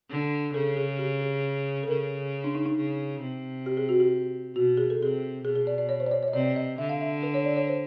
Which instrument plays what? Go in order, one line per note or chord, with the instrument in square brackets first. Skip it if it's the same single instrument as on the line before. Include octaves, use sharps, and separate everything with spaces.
[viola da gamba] D3
[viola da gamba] C#3 [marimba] A4
[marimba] G#4
G4
G#4
A4
[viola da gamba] C#3 [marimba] A#4
[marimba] D4
D#4
D#4
[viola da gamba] C#3
C3
[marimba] G4
G#4
F#4
G4
[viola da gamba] B2 [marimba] F#4
[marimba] G#4
A4
[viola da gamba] C3 [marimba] G#4
[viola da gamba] B2 [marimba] G#4
[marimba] G#4
D5
D5
C#5
C5
D5
C#5
C#5
D#5
[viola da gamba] C3 [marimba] D5
[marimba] D5
D#5
[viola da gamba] D3 [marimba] E5
[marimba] F5
E5
B4
C#5
D5
C#5
C5